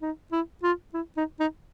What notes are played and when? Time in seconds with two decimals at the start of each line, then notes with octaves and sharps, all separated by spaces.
0.02 D#4
0.32 E4
0.63 F4
0.94 E4
1.17 D#4
1.40 D#4